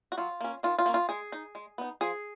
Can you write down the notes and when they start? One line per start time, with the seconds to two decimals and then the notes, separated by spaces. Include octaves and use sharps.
0.12 F#4
0.17 F#3 F4
0.41 A#3 C#4
0.63 D#3 F4
0.79 F4
0.86 A#3 C#4
0.94 F4
1.09 G#3 G#4
1.32 D#4
1.55 G#3
1.78 B3 D#4
2.01 F3 G#4